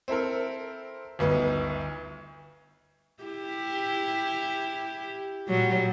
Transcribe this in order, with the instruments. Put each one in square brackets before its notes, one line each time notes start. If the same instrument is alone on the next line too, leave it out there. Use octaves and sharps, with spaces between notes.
[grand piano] C4 E4 A4 A#4
G1 D2 B3 D#4
[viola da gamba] E4 G4
A#2 F#3 G3